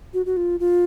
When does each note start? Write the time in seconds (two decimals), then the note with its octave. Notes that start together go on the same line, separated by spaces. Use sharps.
0.14 F#4
0.26 F#4
0.37 F4
0.60 F4